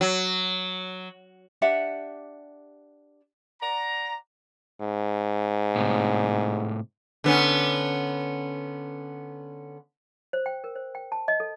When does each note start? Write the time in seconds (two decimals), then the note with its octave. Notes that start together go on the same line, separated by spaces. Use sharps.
0.01 F#3
1.62 D4 G4 E5 F#5
3.61 D5 F#5 A#5
4.81 G#2
5.76 A2 C3
7.24 D3 B3 C#4
10.33 C5
10.46 G5
10.64 A#4
10.76 C5
10.95 G5
11.12 A5
11.28 D#5
11.40 A4